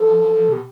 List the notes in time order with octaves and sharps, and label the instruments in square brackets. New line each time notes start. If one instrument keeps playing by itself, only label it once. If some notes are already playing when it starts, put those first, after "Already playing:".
Already playing: [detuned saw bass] F3 [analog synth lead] A4
[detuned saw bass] B2 [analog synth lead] G4